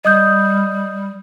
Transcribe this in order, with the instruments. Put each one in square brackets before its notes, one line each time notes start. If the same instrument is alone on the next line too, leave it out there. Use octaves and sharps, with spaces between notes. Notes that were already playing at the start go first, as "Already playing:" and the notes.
[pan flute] G3 [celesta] D#5 D#6 G6